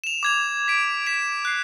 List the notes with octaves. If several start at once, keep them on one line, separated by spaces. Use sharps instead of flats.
E7 F7
D6 G#6 F7
B6 D7
B6 D7 E7
F#6 C7